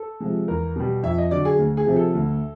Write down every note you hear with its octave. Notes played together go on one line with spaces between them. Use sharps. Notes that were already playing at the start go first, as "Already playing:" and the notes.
Already playing: A4
C3 F3 G#3
E2 A#4
B2 G3
F2 E5
D#5
D3 F#3 D5
G#4
D2
G#4
C3 F3
A4
D2